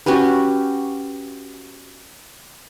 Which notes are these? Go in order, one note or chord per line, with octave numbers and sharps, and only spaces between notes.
C#4 F#4 G4 B4